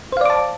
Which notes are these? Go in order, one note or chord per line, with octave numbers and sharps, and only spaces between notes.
C5 D5 F5 A5 D6